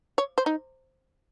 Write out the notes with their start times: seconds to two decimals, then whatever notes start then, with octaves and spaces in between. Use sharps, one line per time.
0.18 C#5
0.38 C5
0.46 D#4